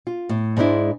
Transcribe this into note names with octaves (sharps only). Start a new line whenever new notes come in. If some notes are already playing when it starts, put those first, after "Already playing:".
F4
A2
G#2 G#3 D4 E4